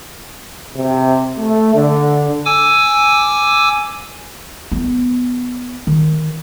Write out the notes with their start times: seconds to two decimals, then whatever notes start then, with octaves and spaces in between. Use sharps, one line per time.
0.75 C3
1.37 A3
1.74 D3
2.45 G#5 D6 E6
4.72 B3
5.87 D#3